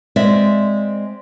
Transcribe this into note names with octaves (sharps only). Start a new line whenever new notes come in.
G#3 C4 D5 E5